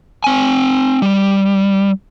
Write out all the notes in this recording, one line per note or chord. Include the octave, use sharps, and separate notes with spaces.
C4 G#5
G3